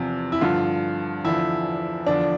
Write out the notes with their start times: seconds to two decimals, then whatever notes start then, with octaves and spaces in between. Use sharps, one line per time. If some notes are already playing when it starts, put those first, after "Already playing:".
Already playing: E2 C3 F3
0.32 E4
0.41 G2 D3 F3 F4
1.24 E2 D3 F3 E4
2.07 E2 D3 F3 D4